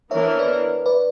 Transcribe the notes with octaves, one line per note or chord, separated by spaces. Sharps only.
E3 B3 D4 A#4 C#5 E5
C#5
B4 D5
B4 D5